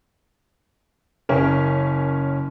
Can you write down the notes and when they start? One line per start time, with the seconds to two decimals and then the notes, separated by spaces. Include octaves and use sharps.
1.29 F#1 C#4 A#4